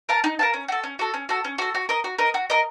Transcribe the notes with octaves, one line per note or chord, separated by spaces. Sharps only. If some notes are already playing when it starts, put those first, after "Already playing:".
A#4 F5 A5
D#4
A#4 F5 A5
C#4
F#4 A4
C#4
F#4 A4
C#4
F#4 A4
C#4
F#4 A4
F#4
A#4 D#5
F#4
A#4 D#5
F#4
A#4 D#5